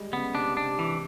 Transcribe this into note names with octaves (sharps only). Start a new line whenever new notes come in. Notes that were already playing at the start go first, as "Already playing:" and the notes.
Already playing: G3 G#3
C#3 B3
C3 D4
D4
C3
E3